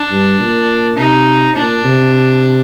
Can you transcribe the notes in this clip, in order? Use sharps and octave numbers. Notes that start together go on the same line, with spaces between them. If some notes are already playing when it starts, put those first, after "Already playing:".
Already playing: D4
G2
A#2
C3 D#4
A#2 D4
C3